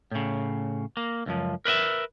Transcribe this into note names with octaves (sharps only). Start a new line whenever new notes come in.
A2 C#3
A#3
C#2 F#2 F3
A#4 B4 D#5 E5